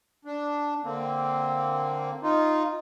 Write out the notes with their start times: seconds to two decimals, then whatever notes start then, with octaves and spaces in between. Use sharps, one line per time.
0.25 D4
0.84 D3 A#3 C4
2.23 D#4 F4